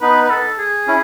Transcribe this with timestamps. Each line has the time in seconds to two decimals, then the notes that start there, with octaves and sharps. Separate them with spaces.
0.01 B3 D#4 B4
0.22 B4
0.30 A4
0.59 G#4
0.87 C#4 E4